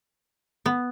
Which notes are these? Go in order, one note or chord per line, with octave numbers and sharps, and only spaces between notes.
B3